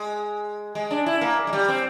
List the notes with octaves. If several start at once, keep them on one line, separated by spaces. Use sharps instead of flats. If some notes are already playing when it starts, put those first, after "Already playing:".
Already playing: G#3
G#3
D4
E4
A#3
G#3
G3
C4